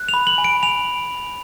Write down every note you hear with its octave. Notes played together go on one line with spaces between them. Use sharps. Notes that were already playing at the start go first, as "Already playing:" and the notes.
Already playing: F#6
F7
B5
F#7
G#5
D7
G#5 F7